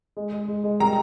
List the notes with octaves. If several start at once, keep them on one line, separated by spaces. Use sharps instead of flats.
G#3
G#3
G#3
G#3
G3 A#5